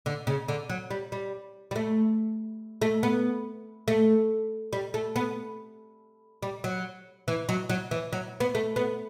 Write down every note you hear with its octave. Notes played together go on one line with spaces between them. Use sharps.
D3
C#3
D3
F#3
G3
G3
G3
A3
A3
B3
A3
G3
A3
B3
G3
F#3
E3
F#3
F#3
E3
F#3
B3
A3
B3